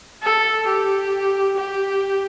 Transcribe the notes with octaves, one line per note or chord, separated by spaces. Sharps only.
A4
G4
G4